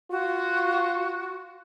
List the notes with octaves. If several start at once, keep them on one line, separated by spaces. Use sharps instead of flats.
F4 F#4